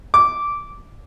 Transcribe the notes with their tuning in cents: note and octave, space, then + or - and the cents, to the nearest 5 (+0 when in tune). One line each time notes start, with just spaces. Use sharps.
D6 -10